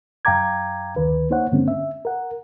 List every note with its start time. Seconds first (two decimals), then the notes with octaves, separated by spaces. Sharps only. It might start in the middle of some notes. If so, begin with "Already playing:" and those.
0.25 F#2 F5 G5 A#5 D6 G#6
0.96 D2 D#3 B4
1.30 A#3 D#4 C5 C#5 F#5
1.52 G2 D3 G#3 A#3 C4 C#4
1.68 E5
2.05 A#4 F#5